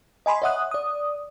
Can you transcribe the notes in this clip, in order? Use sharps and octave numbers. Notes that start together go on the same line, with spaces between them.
D#5 G#5 B5 C6
C#5 D#5 E5 F#5 D#6 F#6
D5 D#6